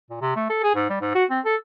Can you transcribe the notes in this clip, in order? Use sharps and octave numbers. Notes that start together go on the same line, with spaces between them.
A#2
C3
A3
A4
G#4
G#2
G3
G#2
F#4
C4
A4